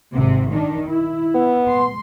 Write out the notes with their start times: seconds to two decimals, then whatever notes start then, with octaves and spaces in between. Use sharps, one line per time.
0.15 G#1 C3
0.52 D#3 D4
0.87 E4
1.35 B3
1.68 C6